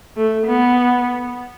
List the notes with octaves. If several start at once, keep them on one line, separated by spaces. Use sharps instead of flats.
A3
B3